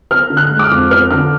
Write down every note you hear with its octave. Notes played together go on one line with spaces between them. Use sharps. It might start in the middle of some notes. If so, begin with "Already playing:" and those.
B3 F6
D3
F#6
G#3
D6
F6
F2
B3 F6
D3 F6